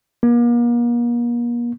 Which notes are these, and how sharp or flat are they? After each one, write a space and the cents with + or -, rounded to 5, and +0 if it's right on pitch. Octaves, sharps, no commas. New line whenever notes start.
A#3 +40